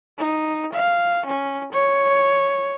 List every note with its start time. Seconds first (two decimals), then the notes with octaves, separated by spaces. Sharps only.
0.18 D#4
0.73 F5
1.26 C#4
1.73 C#5